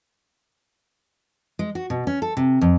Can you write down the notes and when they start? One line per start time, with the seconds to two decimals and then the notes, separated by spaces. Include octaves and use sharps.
1.59 G#3
1.75 F#4
1.90 B2
2.07 C#4
2.22 A4
2.37 C3
2.61 F2